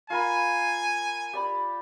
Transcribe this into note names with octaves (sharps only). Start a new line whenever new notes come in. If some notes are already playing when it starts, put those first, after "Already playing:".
F4 A#4 G#5 B5
G4 D5 B5